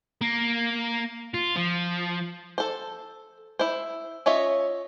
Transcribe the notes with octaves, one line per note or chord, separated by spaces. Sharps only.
A#3
F4
F3
A4 C5
E4 C5
C#4 F4 C#5 D#5 E5